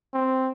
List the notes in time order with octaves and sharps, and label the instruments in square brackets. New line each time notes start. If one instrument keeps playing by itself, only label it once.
[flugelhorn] C4